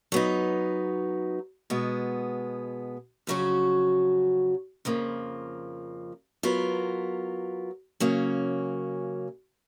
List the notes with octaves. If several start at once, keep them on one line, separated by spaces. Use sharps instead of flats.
F#3 B3 D#4
B2 G#3 B3
F2 C#3 F#3 C#4 F#4
F2 C#3 F3 A#3
F#3 B3 F4 A#4
C#3 F#3 A#3 C#4